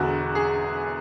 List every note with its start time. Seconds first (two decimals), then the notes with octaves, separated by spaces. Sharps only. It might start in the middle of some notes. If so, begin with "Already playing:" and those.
Already playing: E1 E2 D3 F#4
0.35 G#4